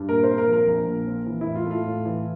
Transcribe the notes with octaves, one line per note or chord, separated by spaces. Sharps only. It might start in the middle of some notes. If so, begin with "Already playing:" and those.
Already playing: G2
A#2 A#4
C4 C5
A#4
F3
A#4
A#1
A#2
C4
E3
E4
A2
F4
A3 F4
A2
E3